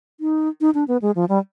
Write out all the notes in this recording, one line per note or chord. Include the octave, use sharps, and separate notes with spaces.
D#4
D#4
D4
B3
G#3
F3
G3